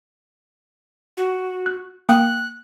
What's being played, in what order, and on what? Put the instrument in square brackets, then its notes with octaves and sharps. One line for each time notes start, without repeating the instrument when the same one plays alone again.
[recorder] F#4
[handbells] F#6
[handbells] A#3 G5 D#6 [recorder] F#6